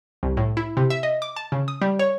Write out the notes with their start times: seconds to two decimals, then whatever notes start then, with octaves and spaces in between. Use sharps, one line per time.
0.23 C2
0.37 A2
0.57 E4
0.77 C3
0.90 E5
1.03 D#5
1.22 D6
1.36 A5
1.52 C#3
1.68 D#6
1.82 G3
1.99 C#5